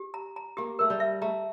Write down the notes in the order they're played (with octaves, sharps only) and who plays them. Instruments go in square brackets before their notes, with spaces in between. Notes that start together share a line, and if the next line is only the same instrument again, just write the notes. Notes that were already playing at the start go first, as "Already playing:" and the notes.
Already playing: [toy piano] G4
A#5
A#5
[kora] A#3 [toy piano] G4
[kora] A3 [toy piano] A#4
[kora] G3
[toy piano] E5
[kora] A3 [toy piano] A#5